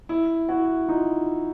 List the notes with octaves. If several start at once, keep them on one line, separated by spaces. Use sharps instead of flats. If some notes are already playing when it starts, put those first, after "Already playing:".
E4
E4 F#4
D#4 F4